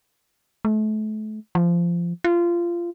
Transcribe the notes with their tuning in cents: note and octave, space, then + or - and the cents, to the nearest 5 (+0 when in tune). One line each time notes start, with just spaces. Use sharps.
A3 -35
F3 -20
F4 -20